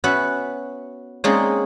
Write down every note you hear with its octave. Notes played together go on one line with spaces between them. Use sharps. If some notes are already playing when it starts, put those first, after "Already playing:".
B3 C#4 F#4 B4 E5 F#5
G#3 A#3 C4 C#4 D#4 D5